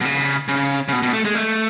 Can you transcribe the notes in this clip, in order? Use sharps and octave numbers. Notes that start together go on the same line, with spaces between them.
B2
C#3
C#3
C#3
B2
B2
A3
G#3
A3